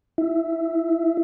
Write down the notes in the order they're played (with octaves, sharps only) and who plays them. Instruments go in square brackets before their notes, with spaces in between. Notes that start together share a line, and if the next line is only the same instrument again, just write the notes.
[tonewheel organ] E4